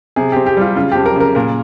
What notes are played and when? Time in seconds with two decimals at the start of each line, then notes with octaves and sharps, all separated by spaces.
0.16 C3 G#4
0.32 C4 G4
0.46 G4
0.57 G3 F4
0.75 C#3 F4
0.92 F2 G4
1.06 A#4
1.16 C#3 A#4
1.35 A#2 A#4